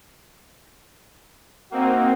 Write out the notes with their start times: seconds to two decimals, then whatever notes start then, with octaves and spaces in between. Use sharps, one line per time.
1.72 A#3 C4 D#4 F#4